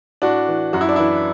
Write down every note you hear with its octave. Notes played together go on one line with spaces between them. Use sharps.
A2 D4 F#4
E3
F#2 F#4
E4
D4
E3 E4